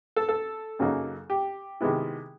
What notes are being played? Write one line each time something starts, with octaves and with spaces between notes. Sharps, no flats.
A4
A4
F#2 C#3 F#3 A#3 D#4
G4
C3 D#3 G#3 B3 E4